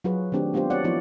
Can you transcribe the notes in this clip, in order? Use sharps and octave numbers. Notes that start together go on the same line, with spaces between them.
F#3 F4 F#4 G#4 B4
D#3 A3 C4 D4 G4
G#3 B3 D4 F4 G4 C5
C4 F#4 C#5 D5 F#5
F3 B3 E4 D5